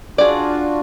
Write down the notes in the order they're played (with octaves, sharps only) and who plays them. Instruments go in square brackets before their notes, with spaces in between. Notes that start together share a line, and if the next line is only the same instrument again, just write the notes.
[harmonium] D4 F4 F#4 [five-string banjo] G#4 D5